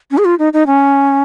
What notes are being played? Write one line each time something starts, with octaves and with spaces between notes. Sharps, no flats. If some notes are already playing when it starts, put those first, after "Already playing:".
C#4
G#4
F4
D#4
D#4
C#4